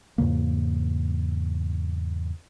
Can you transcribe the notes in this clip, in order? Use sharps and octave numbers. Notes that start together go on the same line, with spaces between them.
E2 G#2 C#3 A#3